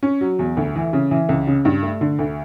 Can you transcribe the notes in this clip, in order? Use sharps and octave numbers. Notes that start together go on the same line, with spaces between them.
C#4
F#3
E2
D2
E3
C#3
E3
C#2
C#3
G2
A3
D3
D2